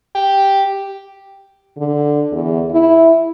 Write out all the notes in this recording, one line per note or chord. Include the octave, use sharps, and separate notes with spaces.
G4
D3
E2
E4